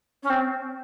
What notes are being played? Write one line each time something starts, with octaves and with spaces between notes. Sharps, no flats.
C#4
C4